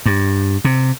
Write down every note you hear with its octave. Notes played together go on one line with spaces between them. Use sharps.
G2
C3